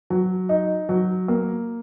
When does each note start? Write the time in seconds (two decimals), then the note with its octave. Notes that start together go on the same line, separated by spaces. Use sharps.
0.10 F#3
0.49 D#4
0.89 F#3
1.28 A#3